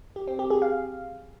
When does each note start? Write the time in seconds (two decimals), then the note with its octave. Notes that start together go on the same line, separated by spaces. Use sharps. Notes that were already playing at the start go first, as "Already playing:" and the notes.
0.16 G4
0.28 C4
0.39 G4
0.50 G#4
0.62 F5